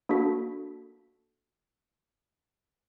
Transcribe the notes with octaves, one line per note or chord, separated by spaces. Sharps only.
A#3 D4 F#4 A4 B6